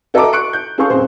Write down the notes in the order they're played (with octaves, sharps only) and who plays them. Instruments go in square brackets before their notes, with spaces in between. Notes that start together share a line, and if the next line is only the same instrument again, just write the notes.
[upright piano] F#4 A4 D#5 E5 A#5 D6
C#6 F#6 C#7 D7
G6
C#4 G#4 A4 F5 C#6
D#1 F#2 C4 G#4 C5